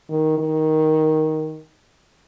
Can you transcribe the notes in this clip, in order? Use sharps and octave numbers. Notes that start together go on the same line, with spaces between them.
D#3
D#3